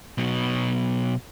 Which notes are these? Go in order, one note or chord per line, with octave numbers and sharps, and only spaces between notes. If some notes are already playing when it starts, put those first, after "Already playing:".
B2 F#3